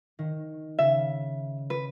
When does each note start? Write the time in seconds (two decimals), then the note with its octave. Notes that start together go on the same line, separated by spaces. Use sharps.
0.19 D#3
0.79 C#3 E5
1.70 B4